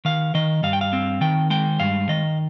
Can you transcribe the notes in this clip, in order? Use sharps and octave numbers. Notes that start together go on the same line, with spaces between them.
D#3 F5
D#3 D#5
G2 F5
G5
F5
C4
D#3 G5
G#3 G5
G2 F5
D#3 D#5